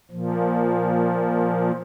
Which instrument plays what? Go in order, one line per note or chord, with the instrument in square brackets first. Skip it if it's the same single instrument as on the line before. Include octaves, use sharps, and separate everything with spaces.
[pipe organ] A#2 F3